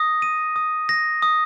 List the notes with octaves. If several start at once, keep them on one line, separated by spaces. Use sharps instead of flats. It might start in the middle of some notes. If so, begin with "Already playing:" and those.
Already playing: D#6 A#6
D#7
D#6
A#6
D#6